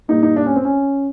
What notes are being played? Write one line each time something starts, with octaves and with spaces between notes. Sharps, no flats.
A#2 G3 A#3 D#4
D#4
D4
C#4
C4
C#4